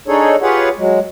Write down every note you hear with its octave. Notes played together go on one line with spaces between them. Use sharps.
D4 D#4 G#4 A4 C#5
F4 G4 G#4 B4 C#5 F#5
F#3 G#3